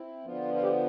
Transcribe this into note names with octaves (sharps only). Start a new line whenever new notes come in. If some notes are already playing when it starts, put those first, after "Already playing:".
Already playing: C4 E4
D3 F3 B3 F4
F4
G4